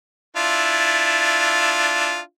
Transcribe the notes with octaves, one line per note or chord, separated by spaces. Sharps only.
D4 E4 F4